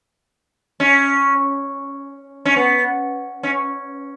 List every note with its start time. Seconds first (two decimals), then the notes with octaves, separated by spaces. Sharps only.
0.80 C#4
2.45 C#4
2.56 B3
3.43 C#4